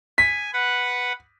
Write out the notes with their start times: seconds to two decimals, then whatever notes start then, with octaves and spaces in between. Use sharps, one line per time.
0.18 G#5 B6
0.53 B4 F#5